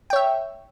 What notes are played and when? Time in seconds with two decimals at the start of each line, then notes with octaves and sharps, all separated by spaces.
0.10 G5
0.13 C#5
0.16 E5